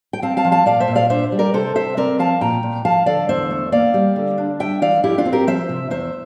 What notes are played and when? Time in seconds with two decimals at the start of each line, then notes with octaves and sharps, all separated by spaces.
0.13 G5
0.22 C4 F5 A5
0.37 F5 A5
0.45 F3
0.52 F5 A5
0.66 A#2 D5 F5
0.80 C5 E5
0.88 A#2
0.95 D5 F5
1.10 D4 C5 E5
1.32 G3
1.39 A#4 D5
1.54 C3 A4 C5
1.75 C3 C5 E5
1.97 C4 A#4 D5
2.19 F3 F5 A5
2.41 A#2 G5 A#5
2.63 A#2
2.85 F3 F5 A5
3.06 D3 D5 F5
3.29 E2 C5 E5
3.51 A3
3.72 A#3 D5 F5
3.94 G3
4.16 D3
4.38 D4
4.59 G3 E5 G5
4.82 E3 D5 F5
5.03 F2 E4 G4
5.18 D4 F4
5.25 C4
5.33 G4 A#4
5.47 F3 C5 E5
5.69 C3
5.90 E2 C5 E5